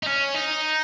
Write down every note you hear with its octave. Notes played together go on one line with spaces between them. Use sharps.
D#4
C#4
D#4